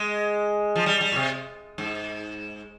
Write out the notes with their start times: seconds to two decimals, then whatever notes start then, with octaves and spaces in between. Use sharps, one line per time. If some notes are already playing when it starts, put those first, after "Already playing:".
Already playing: G#3
0.76 F3
0.86 G3
1.01 G3
1.12 A#2
1.16 C3
1.78 G#2